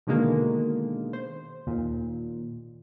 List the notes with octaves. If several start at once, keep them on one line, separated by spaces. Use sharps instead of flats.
B2 D3 D#3 G#3 A#3
C5
D#2 A#2